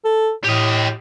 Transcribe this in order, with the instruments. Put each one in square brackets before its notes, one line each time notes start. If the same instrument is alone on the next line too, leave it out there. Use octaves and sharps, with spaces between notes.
[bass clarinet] A4
[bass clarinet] A2 [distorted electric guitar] G4 D#5